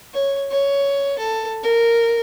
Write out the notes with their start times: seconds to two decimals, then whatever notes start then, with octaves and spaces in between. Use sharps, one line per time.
0.14 C#5
0.51 C#5
1.18 A4
1.63 A#4